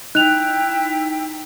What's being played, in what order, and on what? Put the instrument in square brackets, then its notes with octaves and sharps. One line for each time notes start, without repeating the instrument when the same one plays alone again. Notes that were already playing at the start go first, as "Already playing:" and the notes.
[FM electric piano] D#4 [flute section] E4 G5 [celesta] F#6 F7